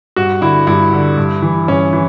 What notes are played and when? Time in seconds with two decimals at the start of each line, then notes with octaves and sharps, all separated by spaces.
0.16 G2 F#4
0.41 D3 E4
0.67 G2 E4
0.92 D3
1.17 G2
1.42 E3
1.68 G2 C#4
1.93 E3